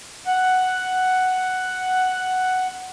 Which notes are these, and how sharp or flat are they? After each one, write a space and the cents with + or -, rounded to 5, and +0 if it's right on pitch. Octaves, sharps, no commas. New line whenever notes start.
F#5 +5